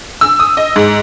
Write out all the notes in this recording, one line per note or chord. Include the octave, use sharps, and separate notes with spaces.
E6
D#6
D#5
G#2